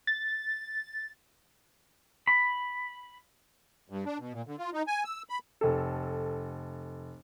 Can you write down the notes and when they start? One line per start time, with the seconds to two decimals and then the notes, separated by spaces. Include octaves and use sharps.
0.07 A6
2.27 B5
3.89 G2
4.06 D4
4.19 B2
4.33 A#2
4.47 D3
4.58 F4
4.73 D#4
4.87 G#5
5.05 E6
5.29 B5
5.61 F1 A4